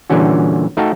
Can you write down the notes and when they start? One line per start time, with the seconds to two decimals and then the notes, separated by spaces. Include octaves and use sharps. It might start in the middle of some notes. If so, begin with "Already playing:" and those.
0.10 A#2 D3 E3 G3 C#4 F#4
0.77 A3 D#4 F#4 F5 G5 A5